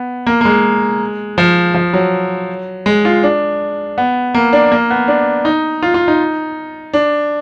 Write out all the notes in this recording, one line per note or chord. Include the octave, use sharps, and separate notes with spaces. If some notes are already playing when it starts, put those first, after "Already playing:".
Already playing: B3
A#3
A#3
G#3
F3
F3
F#3
G#3
F4
D4
B3
A#3
D4
A#3
B3
D4
D#4
F4
F4
D#4
D4